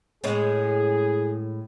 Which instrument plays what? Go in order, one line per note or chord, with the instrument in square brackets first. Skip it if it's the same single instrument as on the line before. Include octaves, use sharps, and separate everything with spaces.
[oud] A2 G#3 C#4 [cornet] G#4